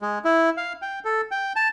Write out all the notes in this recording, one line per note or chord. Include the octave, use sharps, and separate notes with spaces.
G#3
E4
F5
G5
A4
G5
A5